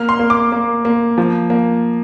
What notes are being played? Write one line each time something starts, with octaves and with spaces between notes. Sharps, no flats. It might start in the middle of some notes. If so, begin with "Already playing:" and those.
Already playing: A#3 F6
C6
A#3
D6
A#3
A#3
F3
A#3